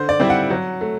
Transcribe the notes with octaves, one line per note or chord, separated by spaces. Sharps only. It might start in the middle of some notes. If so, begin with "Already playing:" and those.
Already playing: D3 C5
D5
G3 C4 E4
F#5
F#3
A3